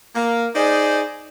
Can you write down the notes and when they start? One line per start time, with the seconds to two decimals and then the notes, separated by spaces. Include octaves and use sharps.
0.15 A#3
0.55 D#4 G#4 C5 D5